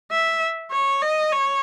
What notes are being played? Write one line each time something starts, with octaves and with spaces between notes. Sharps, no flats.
E5
C#5
D#5
C#5